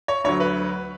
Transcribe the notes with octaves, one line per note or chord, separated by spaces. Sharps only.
C#5
D2 D3 F#3 C#5
B4